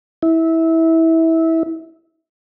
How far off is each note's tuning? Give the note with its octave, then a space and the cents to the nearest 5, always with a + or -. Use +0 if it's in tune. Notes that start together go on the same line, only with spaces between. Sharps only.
E4 -20